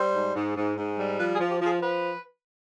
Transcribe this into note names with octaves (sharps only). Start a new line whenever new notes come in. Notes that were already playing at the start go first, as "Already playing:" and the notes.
Already playing: G3 C5
G#2
G#2
G#2
G#2
G3
F3 B4
G#4
F3
G4
F3
G#4
F3 B4